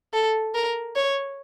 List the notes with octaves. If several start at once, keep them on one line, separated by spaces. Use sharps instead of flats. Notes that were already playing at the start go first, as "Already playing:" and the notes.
A4
A#4
C#5